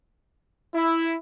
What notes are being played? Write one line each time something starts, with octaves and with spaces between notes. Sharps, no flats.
E4